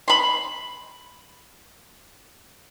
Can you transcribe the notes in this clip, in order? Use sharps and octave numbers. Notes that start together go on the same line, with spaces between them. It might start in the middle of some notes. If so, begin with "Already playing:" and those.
B5 C6